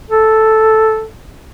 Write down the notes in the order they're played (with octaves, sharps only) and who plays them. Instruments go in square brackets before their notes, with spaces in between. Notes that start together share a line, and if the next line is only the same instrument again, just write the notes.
[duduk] A4